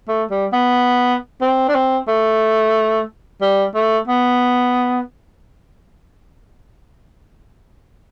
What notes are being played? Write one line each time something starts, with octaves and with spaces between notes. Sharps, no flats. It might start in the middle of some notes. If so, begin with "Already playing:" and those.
A3
G3
B3
C4
D4
C4
A3
G3
A3
B3